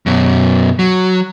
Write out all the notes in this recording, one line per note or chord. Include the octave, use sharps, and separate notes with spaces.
F#2 B2
F#3